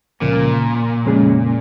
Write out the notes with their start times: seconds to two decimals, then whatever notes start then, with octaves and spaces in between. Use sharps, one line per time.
0.21 C#2 A#2 C#3 F3 A#3
1.05 F2 C#3 G#3 C#4 G#4